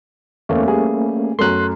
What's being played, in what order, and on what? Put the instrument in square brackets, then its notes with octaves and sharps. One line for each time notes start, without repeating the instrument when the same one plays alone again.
[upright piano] E2 [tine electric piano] A3 A#3 C#4
[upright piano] G3 G#4
[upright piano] F#2 A3 [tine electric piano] C6 F#6